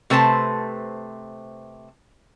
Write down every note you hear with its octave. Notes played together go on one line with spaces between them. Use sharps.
C3 A3 B4 C5 A5